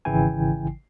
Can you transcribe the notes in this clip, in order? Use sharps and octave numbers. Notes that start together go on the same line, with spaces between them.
G#1 C#3 E3 E4 G5 G#5